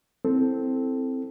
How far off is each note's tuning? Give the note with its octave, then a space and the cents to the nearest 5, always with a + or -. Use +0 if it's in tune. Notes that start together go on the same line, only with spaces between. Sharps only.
C4 +0 E4 +0 A4 +0